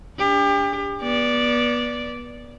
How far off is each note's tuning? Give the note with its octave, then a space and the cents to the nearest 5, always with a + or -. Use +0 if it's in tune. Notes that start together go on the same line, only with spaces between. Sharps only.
D4 -25 G4 +35
B3 -30 D5 -10